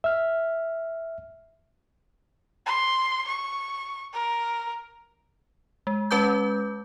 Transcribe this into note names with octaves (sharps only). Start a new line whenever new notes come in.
E5 F6
C6
C#6
A#4
G#3
G#3 C#4 B4 A5 D6 G6